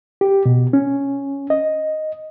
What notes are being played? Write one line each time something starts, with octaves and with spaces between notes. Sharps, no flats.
G4
B2
C#4
D#5